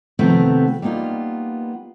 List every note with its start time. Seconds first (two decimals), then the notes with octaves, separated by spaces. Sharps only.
0.19 C3 D#3 F3 A3 B3 C4
0.82 G3 A#3 B3 D#4 F4